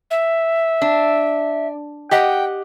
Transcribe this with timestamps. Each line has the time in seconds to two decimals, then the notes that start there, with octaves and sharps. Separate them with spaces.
0.11 E5
0.82 D4
2.11 G4 D#5 F#5 G5